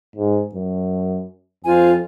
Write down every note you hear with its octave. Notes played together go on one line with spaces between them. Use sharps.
G#2
F#2
F2 F4 C5 G#5